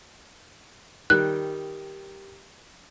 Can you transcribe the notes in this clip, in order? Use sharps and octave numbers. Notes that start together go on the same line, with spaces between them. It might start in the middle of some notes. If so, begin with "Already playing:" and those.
D#3 G3 F#6